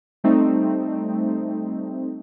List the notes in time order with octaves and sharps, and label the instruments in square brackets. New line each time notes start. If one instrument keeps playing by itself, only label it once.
[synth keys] G3 A3 C4 D#4